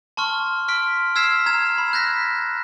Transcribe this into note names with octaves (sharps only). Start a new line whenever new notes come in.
A5 C6 C#6 F6
C6 F6 B6 D7
E6 F6 G#6 B6 C7 E7
A#5 G#6 E7
B5
F#6 G#6 A#6 B6